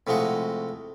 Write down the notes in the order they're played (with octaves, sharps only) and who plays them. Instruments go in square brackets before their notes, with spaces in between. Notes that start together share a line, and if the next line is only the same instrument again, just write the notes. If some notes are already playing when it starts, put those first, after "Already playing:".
[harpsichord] A2 C3 F3 G#3 F#4